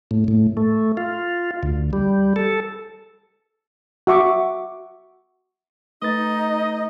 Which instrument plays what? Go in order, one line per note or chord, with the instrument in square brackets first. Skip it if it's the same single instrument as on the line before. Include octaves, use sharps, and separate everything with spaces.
[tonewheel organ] A2
A2
A3
F4
D2
G3
A4
[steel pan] F#4 E5 C#6 D6
[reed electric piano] A3 B4 A6 [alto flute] D#4 [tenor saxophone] D#5